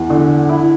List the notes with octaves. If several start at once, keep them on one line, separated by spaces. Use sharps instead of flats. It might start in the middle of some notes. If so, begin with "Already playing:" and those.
Already playing: E2
D3
E4